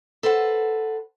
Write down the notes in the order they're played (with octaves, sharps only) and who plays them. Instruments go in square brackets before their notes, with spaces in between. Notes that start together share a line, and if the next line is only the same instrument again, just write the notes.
[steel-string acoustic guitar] A4 B4 C5 F#5